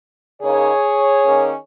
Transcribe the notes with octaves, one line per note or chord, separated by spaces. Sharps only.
C#3 A#3 D#4 G#4 C#5
D#3 A#3 C#4